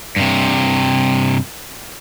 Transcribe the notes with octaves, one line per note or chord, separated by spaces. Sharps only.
G2 C3